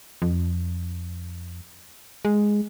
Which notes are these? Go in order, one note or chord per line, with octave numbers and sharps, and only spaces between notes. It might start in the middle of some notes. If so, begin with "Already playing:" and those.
F2
G#3